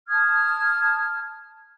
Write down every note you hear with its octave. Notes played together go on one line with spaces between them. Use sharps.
A5 D#6 F6 G#6